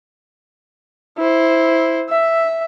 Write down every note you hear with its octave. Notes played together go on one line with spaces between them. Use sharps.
E4 C5
E5